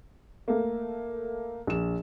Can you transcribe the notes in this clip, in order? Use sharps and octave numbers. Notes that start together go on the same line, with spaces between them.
A3 A#3
A#1 E7